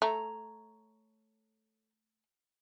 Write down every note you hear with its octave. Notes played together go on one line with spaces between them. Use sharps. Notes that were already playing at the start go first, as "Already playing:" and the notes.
A3 A4 C#5 A#5